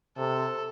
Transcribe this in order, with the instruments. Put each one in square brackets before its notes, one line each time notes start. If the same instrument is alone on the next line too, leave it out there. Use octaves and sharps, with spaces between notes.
[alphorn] C3 [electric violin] A4